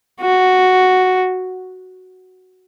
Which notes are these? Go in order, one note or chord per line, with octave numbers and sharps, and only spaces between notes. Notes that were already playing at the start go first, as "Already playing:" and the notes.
F#4